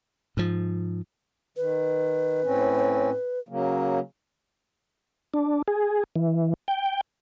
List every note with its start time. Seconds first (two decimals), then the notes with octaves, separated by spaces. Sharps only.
0.37 G#2 F3
1.57 D#3 B4
2.44 A2 C4 C#4
3.49 C#3 F#3 A#3
5.34 D4
5.68 G#4
6.16 E3
6.68 G5